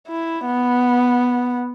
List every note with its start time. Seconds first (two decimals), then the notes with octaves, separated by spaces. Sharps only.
0.08 E4
0.45 B3